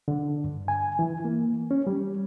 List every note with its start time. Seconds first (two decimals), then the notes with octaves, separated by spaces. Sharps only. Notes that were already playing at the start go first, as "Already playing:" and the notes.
0.08 D3
0.44 G2
0.68 G#5
0.99 E3
1.25 A#3
1.71 C#4
1.87 G3